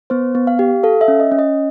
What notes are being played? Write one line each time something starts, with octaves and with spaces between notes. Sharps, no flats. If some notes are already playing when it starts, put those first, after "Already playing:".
B3 C5
B3
F5
G4
A4 F5
E5
C#4
D#5
C#4
D#5